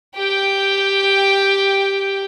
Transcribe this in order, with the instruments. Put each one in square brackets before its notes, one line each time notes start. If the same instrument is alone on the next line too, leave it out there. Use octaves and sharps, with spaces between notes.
[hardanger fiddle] G4 G5